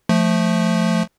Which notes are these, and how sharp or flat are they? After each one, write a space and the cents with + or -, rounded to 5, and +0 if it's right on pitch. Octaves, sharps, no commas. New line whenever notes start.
F3 +0 A3 +0